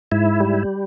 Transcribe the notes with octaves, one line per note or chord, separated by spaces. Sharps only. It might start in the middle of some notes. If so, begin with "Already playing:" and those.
G#2 E4
G3